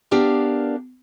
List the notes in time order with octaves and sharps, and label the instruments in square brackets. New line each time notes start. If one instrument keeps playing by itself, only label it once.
[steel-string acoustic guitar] B3 D4 G4 A#4 D5 F5